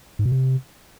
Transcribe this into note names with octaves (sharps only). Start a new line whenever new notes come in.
G#2
B2
C3